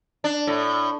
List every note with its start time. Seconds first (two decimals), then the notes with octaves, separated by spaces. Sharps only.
0.24 D4
0.47 A2